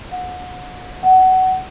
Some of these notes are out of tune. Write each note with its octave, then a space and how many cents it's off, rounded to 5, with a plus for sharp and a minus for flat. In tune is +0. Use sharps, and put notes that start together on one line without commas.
F#5 -30
F#5 +20